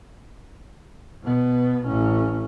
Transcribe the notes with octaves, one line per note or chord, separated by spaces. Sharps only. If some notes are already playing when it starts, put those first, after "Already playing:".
B2 B3
A1 C#4